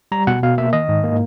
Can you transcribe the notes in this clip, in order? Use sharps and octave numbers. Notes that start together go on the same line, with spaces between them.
G3 A#5
B2 F#5
B2 F5
A#3 E5
D#3 D#5
G#2
A#3